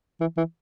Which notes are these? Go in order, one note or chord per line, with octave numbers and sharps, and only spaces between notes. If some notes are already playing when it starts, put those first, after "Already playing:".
E3
E3